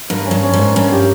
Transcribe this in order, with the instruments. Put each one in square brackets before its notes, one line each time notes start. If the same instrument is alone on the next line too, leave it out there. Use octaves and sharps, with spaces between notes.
[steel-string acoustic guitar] G2 [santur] A#4
[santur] C#4
[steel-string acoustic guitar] G2
[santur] C#4
[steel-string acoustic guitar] G#2
[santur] A#4
[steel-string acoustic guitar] G2 [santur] C#4
[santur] G4